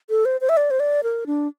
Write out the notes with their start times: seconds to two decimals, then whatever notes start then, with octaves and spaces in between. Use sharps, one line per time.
0.10 A4
0.25 C5
0.41 C5
0.49 E5
0.57 D5
0.71 C5
0.80 D5
1.04 A#4
1.27 D4